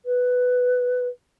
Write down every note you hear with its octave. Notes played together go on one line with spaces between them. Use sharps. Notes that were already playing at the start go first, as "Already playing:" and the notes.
B4